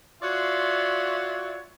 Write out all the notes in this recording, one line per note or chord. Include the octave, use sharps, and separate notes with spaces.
F4 F#4 C#5 D5 E5 C6